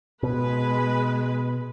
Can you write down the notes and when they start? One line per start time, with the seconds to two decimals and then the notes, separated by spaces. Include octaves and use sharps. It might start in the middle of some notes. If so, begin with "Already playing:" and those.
0.23 B2 G#3 B4